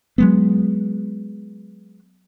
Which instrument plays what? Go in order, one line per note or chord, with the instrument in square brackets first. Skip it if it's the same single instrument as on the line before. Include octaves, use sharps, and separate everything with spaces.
[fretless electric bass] F#3 G#3 B3